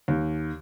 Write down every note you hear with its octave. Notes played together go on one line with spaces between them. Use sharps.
D#2